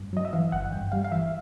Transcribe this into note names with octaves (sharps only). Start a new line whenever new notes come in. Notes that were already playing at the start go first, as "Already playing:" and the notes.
Already playing: G2
F#3 D#5
E5
E3 F5
G1 F#5
G2 G5
G3 F5
F5
E3 E5